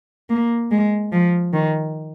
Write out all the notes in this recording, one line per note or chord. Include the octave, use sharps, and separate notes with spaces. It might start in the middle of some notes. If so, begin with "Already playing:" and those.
A#3
G#3
F3
D#3